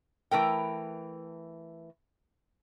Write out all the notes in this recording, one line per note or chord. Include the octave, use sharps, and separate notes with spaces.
E3 A3 A#4 G5